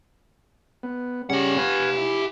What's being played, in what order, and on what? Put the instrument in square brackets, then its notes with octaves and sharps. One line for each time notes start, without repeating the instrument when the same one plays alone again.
[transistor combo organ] B3
[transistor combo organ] C#3 G3 C#4 [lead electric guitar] G4 F#5
[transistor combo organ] B4 F5 G#5
E4